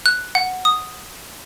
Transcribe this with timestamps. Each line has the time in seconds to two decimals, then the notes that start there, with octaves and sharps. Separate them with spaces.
0.06 F#6
0.35 F#5
0.65 D#6